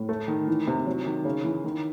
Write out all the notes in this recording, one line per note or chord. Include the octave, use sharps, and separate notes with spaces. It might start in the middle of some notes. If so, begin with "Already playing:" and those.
Already playing: A2
A3
D#3
E3
C3
F#3
D#3
C#3
E3
D#3